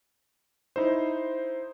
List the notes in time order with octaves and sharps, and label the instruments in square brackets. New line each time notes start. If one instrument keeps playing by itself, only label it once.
[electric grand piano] D#4 E4 C5